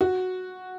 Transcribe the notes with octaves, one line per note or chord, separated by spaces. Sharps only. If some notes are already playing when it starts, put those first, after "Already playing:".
F#4